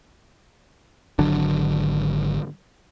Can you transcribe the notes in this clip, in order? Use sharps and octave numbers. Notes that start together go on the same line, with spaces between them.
G#1 D3 F#3 D4